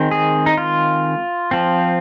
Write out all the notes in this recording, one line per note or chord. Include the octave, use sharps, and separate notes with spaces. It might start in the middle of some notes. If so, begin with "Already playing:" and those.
Already playing: D#3 G#3 C4
G#4
D#4
F4
F3 C4